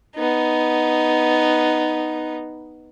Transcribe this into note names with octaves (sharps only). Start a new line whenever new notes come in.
B3 D#4